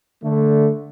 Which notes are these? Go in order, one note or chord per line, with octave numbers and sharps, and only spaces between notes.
D3 A3